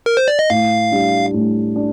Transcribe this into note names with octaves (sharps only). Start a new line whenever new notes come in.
A#4
C5
D5
D#5
A2 F5
G3 D4
A2
D4